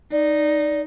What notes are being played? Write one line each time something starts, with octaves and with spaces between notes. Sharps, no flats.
D#4 D5